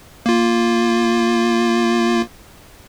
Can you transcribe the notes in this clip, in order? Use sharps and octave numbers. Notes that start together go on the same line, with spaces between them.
A#3 F4